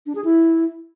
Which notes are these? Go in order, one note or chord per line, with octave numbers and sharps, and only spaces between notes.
D4
G#4
E4